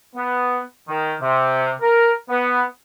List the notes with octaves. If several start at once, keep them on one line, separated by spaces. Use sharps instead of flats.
B3
D#3
C3
A#4
B3